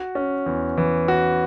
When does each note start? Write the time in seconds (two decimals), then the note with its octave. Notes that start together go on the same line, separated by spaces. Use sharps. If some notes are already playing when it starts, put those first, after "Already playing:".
Already playing: F#4
0.15 C#4
0.46 E2
0.77 E3
1.08 F#4